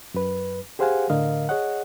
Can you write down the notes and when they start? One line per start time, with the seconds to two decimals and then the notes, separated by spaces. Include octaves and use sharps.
0.14 F#2 B4
0.79 G4 G#4 C5 F5 F#5 G#5
1.10 A2 D3 A#4 D#5 F5
1.49 G#4 C#5 D#5 F#5